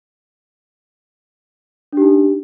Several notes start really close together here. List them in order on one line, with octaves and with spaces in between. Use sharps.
D4 G4 D#4